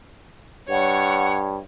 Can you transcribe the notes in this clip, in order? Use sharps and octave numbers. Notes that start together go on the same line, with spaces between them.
G2 C#5 F#5